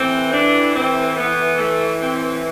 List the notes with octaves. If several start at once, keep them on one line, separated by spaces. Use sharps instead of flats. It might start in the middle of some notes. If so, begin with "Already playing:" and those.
Already playing: A2 E3 C4
D4
C4
B3
A3
C4